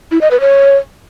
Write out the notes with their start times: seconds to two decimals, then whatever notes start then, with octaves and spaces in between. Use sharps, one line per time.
0.11 E4
0.21 D#5
0.31 B4
0.41 C#5